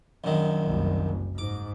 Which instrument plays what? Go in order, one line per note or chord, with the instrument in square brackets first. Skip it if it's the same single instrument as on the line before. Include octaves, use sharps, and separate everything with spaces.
[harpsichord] A#1 F#2 D#3
[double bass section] F#1 C2
[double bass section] G#2 [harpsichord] D6